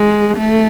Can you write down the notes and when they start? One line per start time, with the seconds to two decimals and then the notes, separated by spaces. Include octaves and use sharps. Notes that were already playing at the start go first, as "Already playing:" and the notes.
Already playing: G#3
0.38 A3